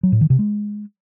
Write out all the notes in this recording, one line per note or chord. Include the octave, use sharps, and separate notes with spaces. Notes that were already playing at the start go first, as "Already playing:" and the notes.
F#3
A2
D#3
C3
G#3